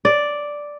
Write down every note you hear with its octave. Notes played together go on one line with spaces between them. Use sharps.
D5